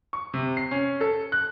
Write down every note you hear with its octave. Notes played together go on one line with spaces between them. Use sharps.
C#6
C3
C7
C#4
A4
F#6